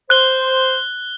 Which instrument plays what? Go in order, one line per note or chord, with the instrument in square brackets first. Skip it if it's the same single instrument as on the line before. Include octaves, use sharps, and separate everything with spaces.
[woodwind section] C5 [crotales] F#6 G7